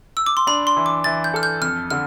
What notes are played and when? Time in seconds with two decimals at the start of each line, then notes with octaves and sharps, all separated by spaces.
0.17 E6
0.26 D6
0.37 C6
0.47 D4 B5
0.67 C6
0.77 E3
0.86 D6
1.04 E3 A6
1.24 G6
1.34 A4 F6
1.43 G6
1.62 F2 F6
1.90 D3 F6